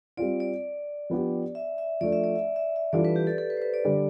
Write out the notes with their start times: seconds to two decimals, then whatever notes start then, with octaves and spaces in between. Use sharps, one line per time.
0.17 G3 C4 F4 D5
0.40 D5
1.10 F3 B3 D4 G4
1.55 E5
1.78 E5
2.01 F3 A3 D4 D5
2.12 E5
2.24 D5
2.36 E5
2.56 E5
2.76 E5
2.93 E3 G3 D4 F4 A4 D5
3.05 B4
3.16 G4
3.27 A4
3.38 A4
3.50 B4
3.57 C5
3.62 B4
3.74 D5
3.85 D3 G3 D4